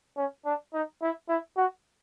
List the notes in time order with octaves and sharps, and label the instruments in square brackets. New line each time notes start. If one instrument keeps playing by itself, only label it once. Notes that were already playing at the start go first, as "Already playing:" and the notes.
[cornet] C#4
D4
D#4
E4
E4
F#4